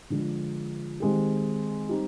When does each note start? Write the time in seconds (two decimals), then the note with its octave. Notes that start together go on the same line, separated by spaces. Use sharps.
0.10 D3 F3 G#3 D4
1.00 D#3 G#3 C4 G4
1.89 G3 C4 D#4 G4